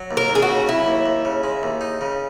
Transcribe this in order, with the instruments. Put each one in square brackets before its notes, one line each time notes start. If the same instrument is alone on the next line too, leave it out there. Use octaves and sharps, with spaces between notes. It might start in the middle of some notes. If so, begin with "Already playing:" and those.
Already playing: [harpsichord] F#3
D#2
[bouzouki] A#4
[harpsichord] D#2
[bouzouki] G#4
F#4
[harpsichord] C#3
[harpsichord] F#3 [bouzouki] E4
[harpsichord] D#2
D#2
C#3
G#3
D#2
D#4
C#3